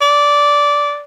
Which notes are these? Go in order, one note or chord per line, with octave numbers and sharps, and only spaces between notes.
D5